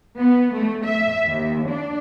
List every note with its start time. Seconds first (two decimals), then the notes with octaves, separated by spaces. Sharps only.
0.19 B3
0.53 A3
0.86 E5
1.28 D#2
1.68 D4